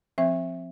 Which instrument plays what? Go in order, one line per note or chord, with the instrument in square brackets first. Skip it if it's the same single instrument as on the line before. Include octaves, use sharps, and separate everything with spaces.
[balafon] F3 C4 E5